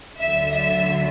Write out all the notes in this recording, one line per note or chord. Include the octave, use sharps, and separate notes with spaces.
D2 D3 F#3 E5
E5